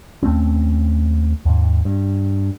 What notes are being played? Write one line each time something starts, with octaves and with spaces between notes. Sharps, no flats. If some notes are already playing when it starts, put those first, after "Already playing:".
D#2 A3 C4 C#4
D#2 G#2
G2